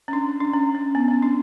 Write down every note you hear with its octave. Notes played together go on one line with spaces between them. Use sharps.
C#4
D4
D4
C#4
C#4
B3
C#4
D4